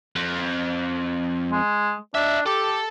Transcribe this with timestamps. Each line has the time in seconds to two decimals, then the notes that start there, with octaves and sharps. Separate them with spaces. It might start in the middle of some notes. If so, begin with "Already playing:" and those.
0.16 F2
1.52 G#3
2.15 D4 D#4 E5
2.46 G4 A4